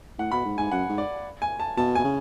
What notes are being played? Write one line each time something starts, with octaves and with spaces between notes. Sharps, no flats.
A2 F#5
B2 B5
G#2
G#2 G#5
F#2 F#5
G#2
D5
G#5
A5
B2 A5
B2 G#5
C#3